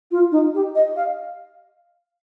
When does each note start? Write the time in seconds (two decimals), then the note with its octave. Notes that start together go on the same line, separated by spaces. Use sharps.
0.11 F4
0.32 D#4
0.54 G4
0.75 D#5
0.96 F5